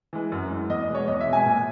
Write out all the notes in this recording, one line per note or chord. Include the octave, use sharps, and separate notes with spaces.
E3 G#3
F#2
E3 G#3
E2 D#5
D#5
B2 G#3
C#5
E2 D#5
E5
B2 G#3
G#5
A#2